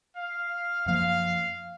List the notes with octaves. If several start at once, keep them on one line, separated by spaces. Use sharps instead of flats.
F5
F#2 F3 A#3 F5